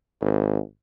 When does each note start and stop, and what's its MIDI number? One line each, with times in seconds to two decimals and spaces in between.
0.21 0.59 32